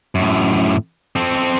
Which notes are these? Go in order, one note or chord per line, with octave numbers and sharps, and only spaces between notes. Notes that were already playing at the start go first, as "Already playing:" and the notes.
F#2 A2
C4 A4